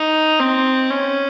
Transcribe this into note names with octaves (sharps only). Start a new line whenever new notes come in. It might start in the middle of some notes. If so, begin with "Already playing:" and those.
Already playing: D#4
C4
C#4